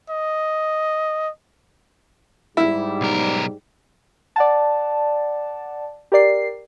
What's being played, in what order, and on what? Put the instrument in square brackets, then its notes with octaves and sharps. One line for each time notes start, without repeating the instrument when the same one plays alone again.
[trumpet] D#5
[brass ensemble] G#2 G3 [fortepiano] E4
[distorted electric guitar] B1 A#4
[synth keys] D5 F#5 A5
G4 A#4 D5 C7